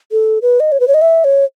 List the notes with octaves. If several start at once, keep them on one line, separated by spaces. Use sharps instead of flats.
A4
B4
D#5
C#5
B4
C#5
D#5
E5
C#5